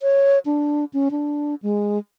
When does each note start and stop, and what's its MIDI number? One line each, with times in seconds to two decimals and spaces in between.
0.01 0.39 73
0.45 0.85 62
0.93 1.09 61
1.11 1.55 62
1.62 1.98 56